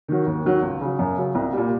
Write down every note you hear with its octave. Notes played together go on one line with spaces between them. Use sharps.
D#3 F#3
D#2
D#3 F#3
C#2
C#3 F#3
F#2
C#3 F#3
C2
A#2 G3